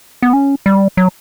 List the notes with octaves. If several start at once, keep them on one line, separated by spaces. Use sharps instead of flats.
B3
C#4
G3
F#3